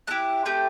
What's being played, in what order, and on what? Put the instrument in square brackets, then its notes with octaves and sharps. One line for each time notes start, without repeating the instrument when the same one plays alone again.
[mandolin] A3 F#6
E4 G4
A3 C4 G4 G6